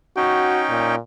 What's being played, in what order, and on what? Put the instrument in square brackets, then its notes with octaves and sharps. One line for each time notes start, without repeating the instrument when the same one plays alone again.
[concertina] C#4 D#4 G5 [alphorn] F#4
[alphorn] A#2